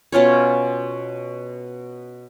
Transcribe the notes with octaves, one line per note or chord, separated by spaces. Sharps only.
B2 C#4 F4 C#5